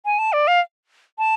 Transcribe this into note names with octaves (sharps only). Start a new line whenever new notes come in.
G#5
A5
D5
F5
A5